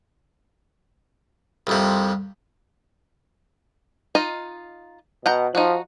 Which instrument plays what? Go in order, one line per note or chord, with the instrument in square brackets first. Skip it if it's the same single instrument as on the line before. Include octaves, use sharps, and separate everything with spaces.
[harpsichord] C2 F2 C3
[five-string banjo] D#4 F4 D#5
[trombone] B2 [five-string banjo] F#5 G5 A#5
[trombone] F3 [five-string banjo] D#4 F#4